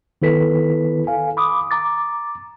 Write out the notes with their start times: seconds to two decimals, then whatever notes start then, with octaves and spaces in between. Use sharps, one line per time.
0.22 D#3 B3 E4 A4 B4 B6
1.07 A4 F5 G#5
1.37 B5 D6 D#6
1.71 A#5 D6 A6